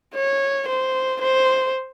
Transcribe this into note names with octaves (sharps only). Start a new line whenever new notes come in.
C#5
C5
C5